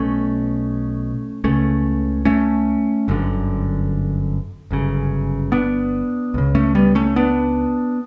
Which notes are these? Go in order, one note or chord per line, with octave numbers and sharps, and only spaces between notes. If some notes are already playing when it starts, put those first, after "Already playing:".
Already playing: B1 B2 A3 C#4
C#2 C#3 A3 C#4
A3 C#4
G1 F#2 D3
G1 F#2 C#3
B3 D4
C#2 C#3
A3 C#4
G3 B3
A3 C#4
B3 D4